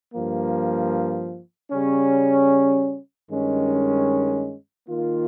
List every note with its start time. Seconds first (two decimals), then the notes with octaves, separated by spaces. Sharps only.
0.13 G2 F3 A#3
1.71 C#3 G3 C#4
3.29 G2 D#3 G#3 C#4
4.87 D#3 A#3 F4